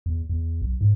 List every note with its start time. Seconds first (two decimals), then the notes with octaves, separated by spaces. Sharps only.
0.06 E2
0.29 E2
0.62 B1
0.81 G#2